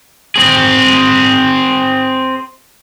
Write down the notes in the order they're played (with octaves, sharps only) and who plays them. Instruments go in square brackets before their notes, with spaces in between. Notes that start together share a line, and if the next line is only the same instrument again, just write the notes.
[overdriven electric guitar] C4 G#4